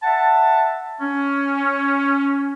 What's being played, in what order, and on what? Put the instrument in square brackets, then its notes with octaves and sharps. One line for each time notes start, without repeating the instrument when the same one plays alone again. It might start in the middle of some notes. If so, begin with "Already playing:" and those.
[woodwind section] E5 F#5 A5
C#4